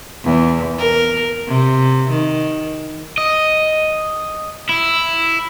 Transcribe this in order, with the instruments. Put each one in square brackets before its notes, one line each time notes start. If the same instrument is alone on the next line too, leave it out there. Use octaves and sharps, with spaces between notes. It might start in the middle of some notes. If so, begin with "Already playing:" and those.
[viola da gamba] E2
A#4
C3
D#3
[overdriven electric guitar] D#5
E4